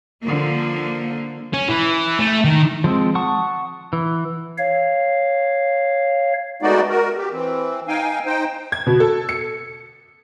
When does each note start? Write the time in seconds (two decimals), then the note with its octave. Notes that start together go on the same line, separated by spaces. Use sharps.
0.23 D3 F3 A#3
1.53 C#4
1.68 E3
2.19 A3
2.44 D#3
2.84 F3 G#3 C4
3.15 F#5 A5 C#6 D#6
3.93 E3
4.58 C#5 F5
6.62 G#3 A3 B3 D#4 F#4 D5
6.89 F#4 A#4
7.17 G4
7.32 E3 C4
7.88 D#4 F5 G5 G#5
8.26 D#4 C5 G5
8.72 G#6
8.86 B2
9.00 A4
9.29 C#7